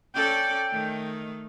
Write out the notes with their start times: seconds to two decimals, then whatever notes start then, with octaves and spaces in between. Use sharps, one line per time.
0.15 C#4 A4 D5 G5
0.71 D#3 A3